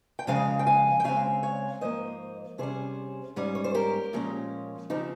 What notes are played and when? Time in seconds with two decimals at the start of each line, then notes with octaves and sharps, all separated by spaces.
0.19 G5
0.27 F2 C#3 F3 G#3 F5 G#5
0.59 G5
0.67 F5 G#5
1.00 G5
1.04 C#3 G#3 C4 F5 G#5
1.43 C#5 F5
1.81 G#2 F3 A#3 C5 D#5
2.58 C3 G3 C#4 G#4 C5
3.36 G#2 G3 C#4
3.55 C#5
3.64 C5
3.74 G4 A#4
4.13 A#2 F3 G#3 C#4
4.90 C#3 F3 C4 D#4 G4